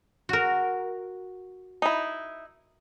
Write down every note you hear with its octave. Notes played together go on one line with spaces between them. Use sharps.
F#4 A#4
D#4 E4